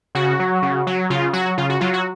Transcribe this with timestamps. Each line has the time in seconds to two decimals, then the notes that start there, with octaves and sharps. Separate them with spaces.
0.15 C#3 F#4
0.39 F#3
0.62 C#3
0.87 F#3
1.10 C#3 F4
1.33 F#3 F#4
1.58 C#3 F4
1.70 F#4
1.81 F#3 F4
1.94 F#4